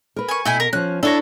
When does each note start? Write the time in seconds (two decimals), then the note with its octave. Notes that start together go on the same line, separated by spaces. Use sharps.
0.16 A#4 B4
0.29 G#5 C#6
0.46 B2 A3 E4 G#5
0.60 A#4
0.73 F3 C#4 F#6
1.03 D4 E4 A4 C#5 A#5